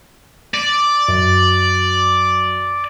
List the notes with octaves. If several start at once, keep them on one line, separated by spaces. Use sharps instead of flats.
D5
F#2